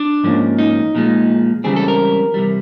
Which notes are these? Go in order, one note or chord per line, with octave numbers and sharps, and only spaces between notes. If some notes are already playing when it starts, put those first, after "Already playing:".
Already playing: D4
G#2 F3 A#3 C#4
D#4
A#2 F3 G#3
C#2 C#3 E3 G3 C4 G#4
A4
A#4
C3 E3 G3